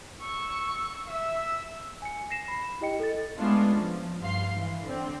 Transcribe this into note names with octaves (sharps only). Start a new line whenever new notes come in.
C#6 E6
E5 E6
G#5 C#7
A#6 C7 E7
B5
E4 G4 D#5 G5 C#7
A4 A6
G#3 A3 B3 C#4 D4 F4
F3
G2 F5 C6 C7
E3
D3 C4